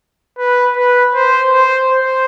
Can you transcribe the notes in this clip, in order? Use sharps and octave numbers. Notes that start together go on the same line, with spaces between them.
B4
B4
C5
C5
C5